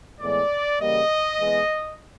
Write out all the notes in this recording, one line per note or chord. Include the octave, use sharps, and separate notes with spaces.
A2 E3 G#3 B3 D5
C#3 E3 G3 A#3 D#5
E3 G#3 B3